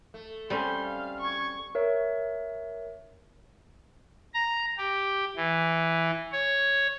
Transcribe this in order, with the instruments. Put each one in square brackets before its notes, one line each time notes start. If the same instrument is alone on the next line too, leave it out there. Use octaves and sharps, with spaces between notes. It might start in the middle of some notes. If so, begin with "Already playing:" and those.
[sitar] A3
[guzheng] G3 C4 C#4 [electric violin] C6
[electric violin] F5
C#6 G#6
[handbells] A#4 C#5 E5
[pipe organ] A#5
G4
E3
C#5